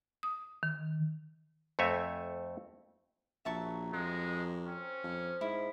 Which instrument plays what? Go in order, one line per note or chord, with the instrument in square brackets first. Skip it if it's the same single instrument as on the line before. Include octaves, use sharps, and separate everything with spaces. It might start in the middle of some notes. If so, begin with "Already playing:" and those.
[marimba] D#6
D#3
[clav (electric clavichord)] F2 A3 C4 C#5 E5 G#5
[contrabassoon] A#1 [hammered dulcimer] F#3 A#3 [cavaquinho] E5 A5 C#6
[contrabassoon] F2 [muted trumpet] G#3
[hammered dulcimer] C4 [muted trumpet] C#4
[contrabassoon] F2 [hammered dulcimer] F3
[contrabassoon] G#2 [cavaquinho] E4